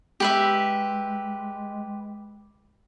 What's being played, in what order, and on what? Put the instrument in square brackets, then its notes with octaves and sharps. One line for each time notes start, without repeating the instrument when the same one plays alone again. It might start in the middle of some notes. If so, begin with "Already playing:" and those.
[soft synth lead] G#3 [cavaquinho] G4 B4 E5